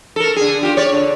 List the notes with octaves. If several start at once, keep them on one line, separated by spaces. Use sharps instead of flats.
A4 A#4
D3 G#4
F4 G4
C#5 D5
D3